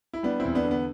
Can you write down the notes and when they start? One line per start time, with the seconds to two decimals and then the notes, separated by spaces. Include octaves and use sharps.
0.13 E4
0.23 G3 B3 D4
0.40 C4 E4
0.45 E2
0.55 B3 D4
0.65 D3
0.71 B3